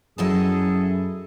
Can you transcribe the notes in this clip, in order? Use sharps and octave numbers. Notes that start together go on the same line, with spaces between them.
F#2 F#3 E4 G#4 A4 D#5 A5